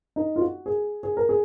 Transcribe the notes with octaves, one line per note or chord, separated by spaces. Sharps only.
D#4
F4
F#4
G#4
G#4
A#4
G#4